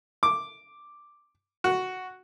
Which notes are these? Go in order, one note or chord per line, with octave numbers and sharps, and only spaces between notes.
D6
F#4